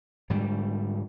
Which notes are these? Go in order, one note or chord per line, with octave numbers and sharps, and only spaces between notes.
G#2 D3 G3